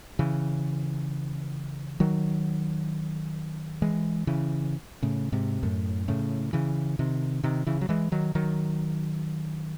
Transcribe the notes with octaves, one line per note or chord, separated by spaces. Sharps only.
C#3 E3
D#3 F#3
E3 G#3
C#3 E3
A2 C#3
G#2 C3
F#2 A2
A2 C#3
C#3 E3
C3 D#3
C3 D#3
C#3 E3
F#3
E3 G#3
D#3 F#3
D#3 F#3